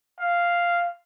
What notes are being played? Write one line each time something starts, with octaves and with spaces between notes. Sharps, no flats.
F5